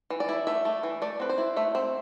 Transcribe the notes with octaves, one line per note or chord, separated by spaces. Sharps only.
E3
D5
E4
A3 E5
A3
E3
A3 D5
C4 B4
C5
E4
A3 E5
C4